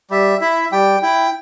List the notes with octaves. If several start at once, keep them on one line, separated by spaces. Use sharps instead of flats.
G3 E5
E4 E5
G3 G5
E4 G5